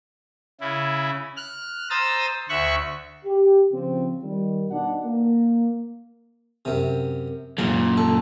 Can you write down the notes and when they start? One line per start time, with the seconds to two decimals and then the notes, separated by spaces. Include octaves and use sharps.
0.61 C#3 E4
1.37 F6 F#6
1.90 C5 A#5 D#6 E6 A6
2.49 D2 E5 C#6 F#6
3.25 G4
3.73 C#3 F3 C4
4.23 D#3 G3
4.70 B2 D4 D#4 F#5
5.05 A#3
6.65 F#2 C3
7.58 F#2 A#2 C#3
7.97 A4